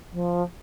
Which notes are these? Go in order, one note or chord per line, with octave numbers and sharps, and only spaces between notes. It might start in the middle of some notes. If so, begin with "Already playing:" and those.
F3